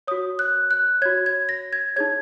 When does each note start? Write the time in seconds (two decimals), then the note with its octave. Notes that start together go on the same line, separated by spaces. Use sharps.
0.07 F#4 C#5 D#6
0.39 F#6
0.71 F#6
1.02 F#4 C#5 G#6
1.26 G#6
1.49 A#6
1.73 G#6
1.96 D#4 G#4 C#5 G#6